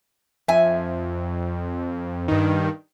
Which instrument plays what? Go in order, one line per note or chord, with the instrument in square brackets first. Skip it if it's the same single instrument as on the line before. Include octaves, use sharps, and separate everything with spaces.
[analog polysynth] F2 [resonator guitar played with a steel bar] E5 G#5
[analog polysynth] G2 D#3